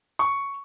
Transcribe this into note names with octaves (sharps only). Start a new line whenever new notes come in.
C#6